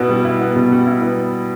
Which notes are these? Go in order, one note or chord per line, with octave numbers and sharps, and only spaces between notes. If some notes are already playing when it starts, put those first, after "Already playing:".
Already playing: B2 B3 E4
G3
E4
B3
B2
G3
E4
B3